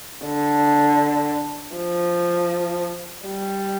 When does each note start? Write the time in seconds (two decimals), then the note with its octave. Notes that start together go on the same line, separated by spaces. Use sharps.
0.25 D3
1.76 F3
3.26 G3